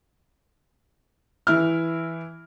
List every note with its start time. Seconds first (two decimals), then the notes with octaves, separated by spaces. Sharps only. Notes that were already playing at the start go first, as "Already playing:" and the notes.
1.47 E3 E4 F6